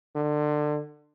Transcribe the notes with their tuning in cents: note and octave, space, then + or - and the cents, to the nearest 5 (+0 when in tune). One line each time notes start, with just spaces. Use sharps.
D3 +25